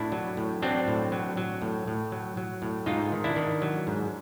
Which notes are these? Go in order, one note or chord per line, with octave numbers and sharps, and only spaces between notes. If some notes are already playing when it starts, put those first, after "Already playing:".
Already playing: A2 D4 E4
F#3
A2
F#3 C4 D4
A2
F#3
F#3
A2
A2
F#3
F#3
A2
G#2 D#4 F4
D#3
D4 E4
D#3
F#3
G#2